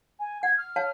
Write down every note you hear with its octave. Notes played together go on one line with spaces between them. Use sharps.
G#5
F#5 G#6
F6
C#5 F5 A5